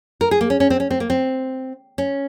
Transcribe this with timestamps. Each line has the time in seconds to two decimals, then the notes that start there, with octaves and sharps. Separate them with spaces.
0.21 A#4
0.31 G#4
0.41 A#3
0.50 C#4
0.60 C#4
0.70 C4
0.80 C#4
0.90 C4
1.00 A#3
1.10 C4
1.98 C#4